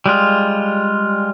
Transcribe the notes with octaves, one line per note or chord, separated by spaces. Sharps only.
G3 G#3 F4